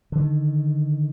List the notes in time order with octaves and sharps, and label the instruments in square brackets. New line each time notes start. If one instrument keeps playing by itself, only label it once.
[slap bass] D3 D#3